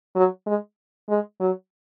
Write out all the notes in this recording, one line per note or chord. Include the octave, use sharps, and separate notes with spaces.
F#3
G#3
G#3
F#3